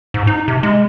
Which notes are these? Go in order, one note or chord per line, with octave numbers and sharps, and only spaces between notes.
G#2
D#4
C3
G#3